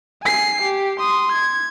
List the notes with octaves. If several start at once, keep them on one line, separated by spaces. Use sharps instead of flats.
G#5 C7
G4
C6 D#6
G#6